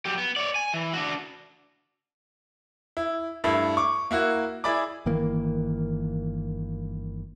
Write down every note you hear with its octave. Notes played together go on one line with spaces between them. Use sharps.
F#3 G4
B3
C#5 D5
G#5
E3
D4 F#4
E4
G2 A3 E4 B5
C#6 D6
A#3 E4 F#4
E4 G#4 D5 B5 D6
G1 D#3 E3 A#3